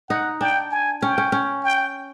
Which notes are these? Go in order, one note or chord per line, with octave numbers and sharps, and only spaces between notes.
D#4 F#5
D4 G5
G#5
C#4 G5
C#4
C#4
G5